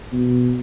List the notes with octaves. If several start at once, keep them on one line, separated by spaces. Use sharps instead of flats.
B2